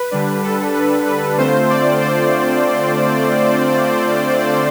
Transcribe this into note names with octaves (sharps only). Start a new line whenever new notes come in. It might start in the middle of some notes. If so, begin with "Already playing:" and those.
Already playing: B4
D3 G3 D4
A4
B4
B4
D3 A3 C4 F4 C5
D5
C5